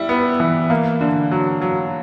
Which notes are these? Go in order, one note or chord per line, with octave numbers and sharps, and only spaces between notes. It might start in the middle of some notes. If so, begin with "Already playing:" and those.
Already playing: G3 E4
B3
E3
A#3
D3
F#3
F#3